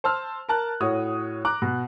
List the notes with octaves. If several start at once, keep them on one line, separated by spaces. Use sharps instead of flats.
C5 A5 E6 F6
A#4 A5 F#6
A2 F#4 C#5 D#6
A#5 D6 F#6
B2